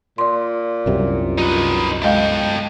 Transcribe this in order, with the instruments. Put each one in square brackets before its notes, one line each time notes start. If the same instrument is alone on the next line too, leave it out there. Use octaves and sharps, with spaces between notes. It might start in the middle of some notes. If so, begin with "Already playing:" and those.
[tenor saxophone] A#2 [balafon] D5 C6
[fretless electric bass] C2 F#2 C3
[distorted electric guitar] D#4 B4 [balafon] F4
[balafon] G#3 D#5 F5 [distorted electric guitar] A4 G5